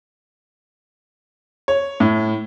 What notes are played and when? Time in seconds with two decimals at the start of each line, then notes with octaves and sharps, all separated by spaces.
1.68 C#5
2.00 A2